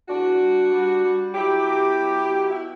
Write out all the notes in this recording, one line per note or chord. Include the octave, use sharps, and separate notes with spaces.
E2 D4 F#4
G3
G3
G3
F#3 E4 G4
B2
F#3
B2
E4